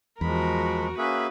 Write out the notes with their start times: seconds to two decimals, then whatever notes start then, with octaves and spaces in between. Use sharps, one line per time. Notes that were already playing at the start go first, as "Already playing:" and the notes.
0.21 E2 F3 G#3 F#4 A#4 B5
0.98 A#3 C#4 F#4 G#4 B4 E5